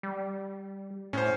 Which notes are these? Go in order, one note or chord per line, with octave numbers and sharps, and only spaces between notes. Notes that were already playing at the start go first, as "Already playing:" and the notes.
G3
A2 C#4 C5